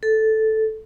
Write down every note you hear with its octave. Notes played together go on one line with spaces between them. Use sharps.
A4